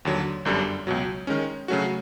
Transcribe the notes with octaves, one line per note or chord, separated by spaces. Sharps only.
D#2 D3 F#3
G1 F#2 D3 G3
C#2 B2 F#3
D#3 G#3 C#4
C#3 F#3 A3 C#4 F#4